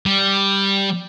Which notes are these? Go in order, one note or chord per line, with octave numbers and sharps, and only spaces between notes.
G3